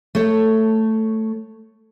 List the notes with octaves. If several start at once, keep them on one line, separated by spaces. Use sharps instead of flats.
A3 A4 C#5